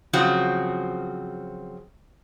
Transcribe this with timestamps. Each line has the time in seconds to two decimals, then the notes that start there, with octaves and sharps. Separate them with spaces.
0.13 C#3 F3 F#3 C4 F#4